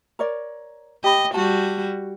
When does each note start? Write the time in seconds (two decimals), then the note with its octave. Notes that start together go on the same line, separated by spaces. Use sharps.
0.19 A#4 C#5 D5
1.04 G4 D#5 B5
1.34 G3 F#4 A5